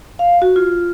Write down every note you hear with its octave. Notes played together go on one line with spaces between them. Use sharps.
F5
F#4
F4